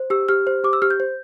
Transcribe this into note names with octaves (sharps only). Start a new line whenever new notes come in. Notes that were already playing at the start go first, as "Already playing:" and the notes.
Already playing: C5
G4 E6
G4 F6
C5
G4 D6
E6
G4 F6
G6
C5